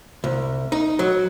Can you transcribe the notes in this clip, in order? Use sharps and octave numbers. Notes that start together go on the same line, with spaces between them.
C2
D#4
F#3